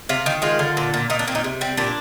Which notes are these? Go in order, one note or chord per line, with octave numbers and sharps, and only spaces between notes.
C3 F4
D#3
G#3 F4
D3
A#2
A#2
A#2 D#4
D4
A#2 C4
D#4
C3
G3 C4
A#2 D4